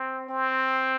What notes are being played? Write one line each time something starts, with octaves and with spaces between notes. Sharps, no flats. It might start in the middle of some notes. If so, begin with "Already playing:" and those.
Already playing: C4
C4